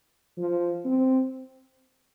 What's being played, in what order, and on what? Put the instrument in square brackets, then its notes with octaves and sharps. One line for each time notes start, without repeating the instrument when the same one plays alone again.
[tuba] F3
C4